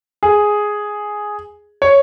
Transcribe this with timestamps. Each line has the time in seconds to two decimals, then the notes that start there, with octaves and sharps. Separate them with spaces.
0.23 G#4
1.82 C#5